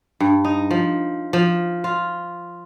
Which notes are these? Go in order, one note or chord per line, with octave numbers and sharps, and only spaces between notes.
G2
D#4
F3
F3
F4